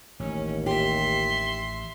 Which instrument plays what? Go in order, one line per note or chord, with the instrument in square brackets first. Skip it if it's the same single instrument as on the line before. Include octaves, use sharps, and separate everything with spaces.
[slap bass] A1 [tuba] D#2 [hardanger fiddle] C#4
[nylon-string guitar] G4 [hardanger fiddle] E5 C6